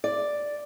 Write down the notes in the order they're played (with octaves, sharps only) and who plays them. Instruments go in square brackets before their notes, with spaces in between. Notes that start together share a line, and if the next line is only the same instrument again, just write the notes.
[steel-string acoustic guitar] D5